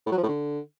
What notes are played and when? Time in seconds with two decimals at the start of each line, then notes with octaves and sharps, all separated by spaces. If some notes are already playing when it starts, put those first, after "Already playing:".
0.06 A2
0.12 F#3
0.17 F3
0.23 A2
0.29 D3